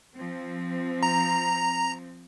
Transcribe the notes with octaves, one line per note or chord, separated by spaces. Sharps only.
F3 C4
A#5